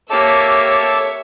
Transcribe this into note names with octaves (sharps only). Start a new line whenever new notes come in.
A#3 G4 A4 C#5 E5 A5 D6